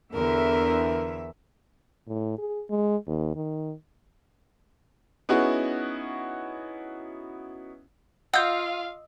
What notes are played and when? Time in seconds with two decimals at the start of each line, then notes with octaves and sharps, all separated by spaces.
0.14 E2 D3 A#4 E5
2.07 A2
2.38 G#4
2.70 G#3
3.07 D#2
3.35 D#3
5.29 B3 C#4 D#4 E4 F#4 G#4
8.34 F4 D#5 F5 F#5 D#6 E6 G6